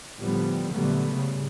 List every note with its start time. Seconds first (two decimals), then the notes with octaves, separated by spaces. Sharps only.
0.18 A2 D3 F3 G3 B3
0.71 A#2 D3 F#3 G3 A3 B3
1.12 G#2 C#3 G3